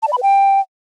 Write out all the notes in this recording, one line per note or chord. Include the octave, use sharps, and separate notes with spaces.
A5
D5
B5
B4
G5